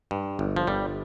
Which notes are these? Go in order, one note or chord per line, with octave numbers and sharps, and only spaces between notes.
G2
G1
F3
G1 G3